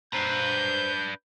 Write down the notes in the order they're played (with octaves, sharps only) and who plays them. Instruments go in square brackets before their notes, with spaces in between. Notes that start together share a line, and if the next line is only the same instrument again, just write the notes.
[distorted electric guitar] D4 B4 [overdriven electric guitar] C5 A#5 [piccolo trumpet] G6